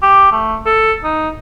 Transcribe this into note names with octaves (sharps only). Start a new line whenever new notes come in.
G4
A3
A4
D#4